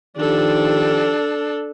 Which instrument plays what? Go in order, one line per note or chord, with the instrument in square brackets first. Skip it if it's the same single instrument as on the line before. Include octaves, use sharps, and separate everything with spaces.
[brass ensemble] D#3 F3 G4 [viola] D4 A4